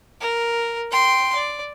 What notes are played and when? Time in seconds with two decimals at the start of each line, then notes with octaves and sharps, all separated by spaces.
0.21 A#4
0.91 G5 C6
1.35 D5